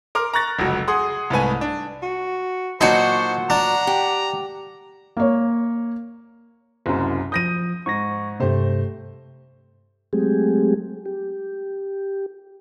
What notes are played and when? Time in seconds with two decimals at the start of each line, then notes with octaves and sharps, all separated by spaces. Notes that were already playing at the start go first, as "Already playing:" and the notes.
0.15 A#4 C6 D6 F6
0.33 A#5 C#6 F#6 A6 A#6
0.59 F1 C#2 F#3 F#5
0.88 G#4 F#5 C6 D#6
1.30 C2 G#2 A3 B4 G#5
1.61 D4
2.03 F#4
2.81 A#2 F#3 D#4 F#4 C5 A5
3.50 D4 F#5 A#5
3.87 G4
5.17 A#3 C#5
6.86 F#1 C2 F#2
7.32 F3 D#6 G6 A#6 D#7
7.86 G#2 C#6 G#6 A#6
8.40 G2 C3 A3 G4 C5
10.13 F#3 G#3 A3 C4 G4 G#4
11.06 G4